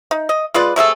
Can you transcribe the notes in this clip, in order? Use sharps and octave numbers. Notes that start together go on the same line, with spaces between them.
D#4
D#5
G#3 F4 B4 D5
C3 A3 G#4 A4